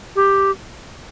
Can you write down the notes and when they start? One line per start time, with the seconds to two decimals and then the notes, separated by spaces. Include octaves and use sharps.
0.16 G4